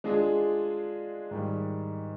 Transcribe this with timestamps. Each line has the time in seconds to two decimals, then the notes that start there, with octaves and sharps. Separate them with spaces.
0.04 G#3 D4 F4 G#4
1.31 G#2 D#3 G3